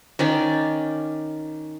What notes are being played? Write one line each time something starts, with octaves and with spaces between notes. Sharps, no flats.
D#3 C#4 D5